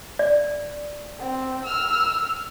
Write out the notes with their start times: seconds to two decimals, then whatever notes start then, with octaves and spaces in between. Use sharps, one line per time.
0.19 D5
1.20 C4
1.64 E6 F6